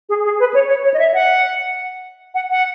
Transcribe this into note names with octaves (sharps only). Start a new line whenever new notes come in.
G#4
G#4
B4
C#5
C#5
C#5
D#5
E5
F#5
F#5
F#5